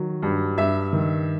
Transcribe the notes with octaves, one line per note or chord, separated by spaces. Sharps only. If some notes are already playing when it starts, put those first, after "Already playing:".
Already playing: D#3 F#3
G2
G2 E5
D#3